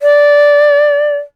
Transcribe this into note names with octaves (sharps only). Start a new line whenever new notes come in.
D5